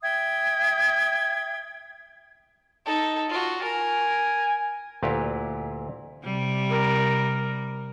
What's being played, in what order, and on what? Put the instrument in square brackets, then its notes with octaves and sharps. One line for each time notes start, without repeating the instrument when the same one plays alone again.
[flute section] E5 G5 D#6 G#6
[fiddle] D#4 A4
F4 F#4
[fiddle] A#4 [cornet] G#5
[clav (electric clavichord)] D2 A#2 E4 G4 B4 F5
[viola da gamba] C3 G3
[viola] A#4